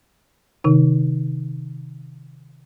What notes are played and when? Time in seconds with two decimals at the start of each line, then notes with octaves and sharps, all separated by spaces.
0.64 C3 D#3 D#4